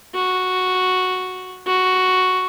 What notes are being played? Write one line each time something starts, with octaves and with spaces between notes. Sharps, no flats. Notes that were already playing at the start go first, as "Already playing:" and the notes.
F#4
F#4